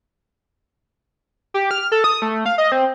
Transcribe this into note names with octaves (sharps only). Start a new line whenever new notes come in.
G4
F6
A4
D#6
A3
F5
D#5
C4